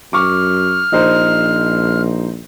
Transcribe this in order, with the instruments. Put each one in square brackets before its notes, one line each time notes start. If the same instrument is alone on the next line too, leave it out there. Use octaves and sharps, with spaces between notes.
[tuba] F#2 [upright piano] C#6 D6 [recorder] F6
[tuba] A#1 [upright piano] D#4 C5